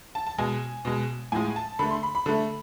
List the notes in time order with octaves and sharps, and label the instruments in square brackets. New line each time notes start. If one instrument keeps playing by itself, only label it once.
[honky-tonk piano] A5
A5
B2 G#3 G#5
B2 G#3
A2 F3 G#3 G#5
A5
D3 A3 B5
C6
B5
B5
D3 A3